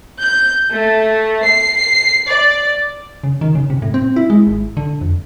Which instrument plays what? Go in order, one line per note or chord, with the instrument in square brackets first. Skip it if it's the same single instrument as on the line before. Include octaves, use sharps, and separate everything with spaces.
[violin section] G6
A3
C7
D5
[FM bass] C#3
D#3
C#3
C3
A2
C4
E4
G#3
G#1
D3
F2